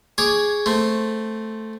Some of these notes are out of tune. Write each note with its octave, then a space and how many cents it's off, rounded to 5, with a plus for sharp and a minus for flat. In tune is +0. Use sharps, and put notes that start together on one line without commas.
G#4 +0 C#5 +10 D6 +5
A3 +0 C4 +0